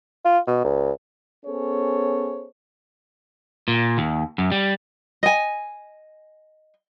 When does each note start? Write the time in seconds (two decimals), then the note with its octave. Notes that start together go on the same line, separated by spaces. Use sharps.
0.25 F4
0.47 B2
0.65 C#2
1.46 B3 C#4 G#4 A4 C5 C#5
3.68 A#2
3.98 D#2
4.38 F#2
4.52 G3
5.23 D#5 G#5